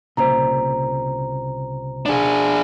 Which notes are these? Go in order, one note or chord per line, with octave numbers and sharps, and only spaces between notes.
C2 A#2 C#3 C5 A#5
D4 G#4